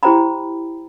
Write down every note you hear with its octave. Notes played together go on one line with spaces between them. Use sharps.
E4 G4 C5 G5 A#5 B5